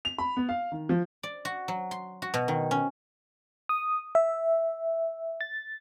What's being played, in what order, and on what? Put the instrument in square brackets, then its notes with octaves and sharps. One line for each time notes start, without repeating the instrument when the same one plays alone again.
[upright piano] F7
B5
B3
F5
D#3
F3
[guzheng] D5
F#4
F#3
C6
F#4
B2
D#3
C#4
[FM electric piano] D#6
E5
A6